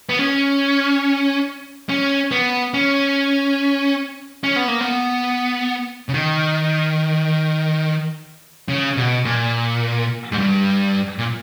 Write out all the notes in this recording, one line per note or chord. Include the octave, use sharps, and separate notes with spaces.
B3
C#4
C#4
B3
C#4
C#4
B3
A#3
B3
C#3
D#3
C#3
B2
A#2
G#2
G2
A#2